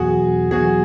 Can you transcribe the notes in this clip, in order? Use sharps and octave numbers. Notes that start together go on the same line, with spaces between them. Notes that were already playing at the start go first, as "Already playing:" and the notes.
Already playing: E2 B2 F#3 F#4 G#4
E2 B2 F#3 F#4 G#4